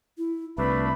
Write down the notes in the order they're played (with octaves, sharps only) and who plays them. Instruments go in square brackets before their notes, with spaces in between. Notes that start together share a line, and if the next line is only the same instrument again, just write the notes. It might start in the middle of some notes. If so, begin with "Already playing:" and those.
[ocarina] E4
[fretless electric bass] C2 [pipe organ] A3 D4 [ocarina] B4 [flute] B5